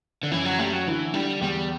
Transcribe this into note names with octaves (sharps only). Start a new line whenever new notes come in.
D3
F#2 E3
F#3
G3 A3
F#3
D3 E3
D3 G3
E2 G3